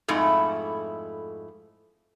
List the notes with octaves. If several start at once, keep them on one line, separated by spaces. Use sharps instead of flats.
F2 G#2 A3 E4